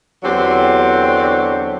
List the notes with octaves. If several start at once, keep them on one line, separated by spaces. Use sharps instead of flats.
E2 D3 F#3 C4 D4 G4